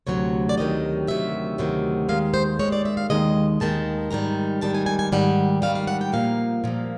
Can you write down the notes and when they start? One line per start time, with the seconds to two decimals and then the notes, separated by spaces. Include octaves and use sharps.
0.07 D2 C3 F#3 C#5
0.49 D5
0.57 D2 C3 D#3 F#3 D#5
1.07 D2 C3 D#3 F#3 E5
1.58 D2 C3 D#3 F#3
2.09 D#2 D#3 G#3 F5
2.34 C5
2.59 D#2 D#3 G#3 C#5
2.72 D5
2.85 E5
2.97 F5
3.10 D#2 D#3 G#3 D#5
3.60 D#2 D#3 G#3 A5
4.11 G#2 D#3 G3 A#5
4.61 G#2 D#3 G3 A5
4.75 G#5
4.86 G#5
4.99 G#5
5.12 G#2 D#3 G3 F#5
5.62 G#2 D#3 G3 F5
5.75 F5
5.87 F#5
6.01 G5
6.12 A#2 F3 A#3 F5
6.64 A#2 F3 A#3